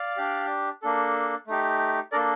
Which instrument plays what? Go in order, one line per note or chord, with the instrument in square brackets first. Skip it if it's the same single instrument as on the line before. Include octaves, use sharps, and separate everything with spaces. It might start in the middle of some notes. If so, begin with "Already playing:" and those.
Already playing: [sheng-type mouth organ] D5 F5
D4 G4
A#3 D4 A4
A3 D#4 G4
A#3 D4 A4 A#4 D5